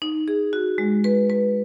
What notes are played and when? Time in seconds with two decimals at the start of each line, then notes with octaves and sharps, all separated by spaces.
0.02 D#4
0.28 G#4
0.53 F#4
0.78 G#3
1.04 B4
1.30 B4